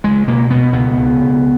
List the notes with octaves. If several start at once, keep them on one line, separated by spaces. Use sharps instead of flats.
C#2 G#3
B2 A#3
B2 B3
C#2 B3
C#2
B2